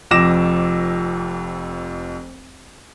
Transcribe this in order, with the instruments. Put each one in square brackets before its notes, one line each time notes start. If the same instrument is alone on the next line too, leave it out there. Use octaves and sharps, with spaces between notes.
[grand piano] F1 F2 D6 A#6 E7